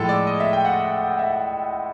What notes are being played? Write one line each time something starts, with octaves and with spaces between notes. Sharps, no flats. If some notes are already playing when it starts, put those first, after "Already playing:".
Already playing: A2 F3 G#3 A4
D5
D#5
E5
G5
F#5
E5